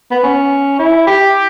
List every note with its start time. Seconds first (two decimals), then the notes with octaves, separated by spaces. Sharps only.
0.11 B3
0.23 C#4
0.79 E4
1.07 G4